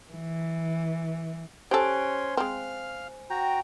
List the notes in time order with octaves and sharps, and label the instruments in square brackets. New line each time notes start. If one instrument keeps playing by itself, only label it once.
[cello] E3
[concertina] C#4 C#5 C6 [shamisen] G4 A4 [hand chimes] C5 G#5
[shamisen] G#3 C4 [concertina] F5 F6
[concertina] F#4 A#5 [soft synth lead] G5